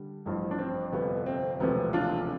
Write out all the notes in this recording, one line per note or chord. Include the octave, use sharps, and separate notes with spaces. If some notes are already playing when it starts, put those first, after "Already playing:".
Already playing: D3 G3
A1 G2 F3
D4
C4
G1 F2 C3 B3
C4
E1 D2 C3 F3 B3
D4 F4